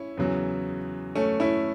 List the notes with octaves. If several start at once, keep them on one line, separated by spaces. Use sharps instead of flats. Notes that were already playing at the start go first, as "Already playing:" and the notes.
Already playing: C#4 E4
E2 C#3 F#3
A3 C#4
C#4 E4